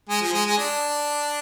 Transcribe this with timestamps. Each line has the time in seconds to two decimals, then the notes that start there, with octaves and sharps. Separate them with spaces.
0.09 G#3
0.21 F3
0.33 G#3
0.46 G#3
0.57 D4